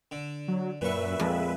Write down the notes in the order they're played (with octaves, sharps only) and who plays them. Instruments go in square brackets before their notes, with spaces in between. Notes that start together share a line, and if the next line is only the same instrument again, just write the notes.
[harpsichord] D3
[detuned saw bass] F#3
[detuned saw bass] F#2 [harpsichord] A#2 C#6 [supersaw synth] B4 E5
[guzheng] F2 [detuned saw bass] G#3